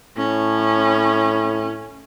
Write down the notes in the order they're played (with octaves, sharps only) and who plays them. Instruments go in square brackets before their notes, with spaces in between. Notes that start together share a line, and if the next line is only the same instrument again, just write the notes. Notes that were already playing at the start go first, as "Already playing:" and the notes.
[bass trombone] A2 [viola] C#4